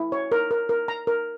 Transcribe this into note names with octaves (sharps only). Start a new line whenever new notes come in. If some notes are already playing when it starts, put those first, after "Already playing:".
Already playing: E4
C#5
A#4
A#4
A#4
A#5
A#4